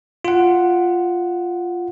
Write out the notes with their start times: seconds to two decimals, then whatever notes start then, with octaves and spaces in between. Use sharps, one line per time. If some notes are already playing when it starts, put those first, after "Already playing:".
0.25 F4 F#5